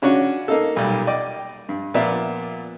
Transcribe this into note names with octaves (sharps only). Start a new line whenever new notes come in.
C#3 C#4 D4 F#4 C#5
A#3 D#4 A4
B1 A#2 G3
D5 D#5 G5 D6
G2
A#2 F3 B3 D5 E5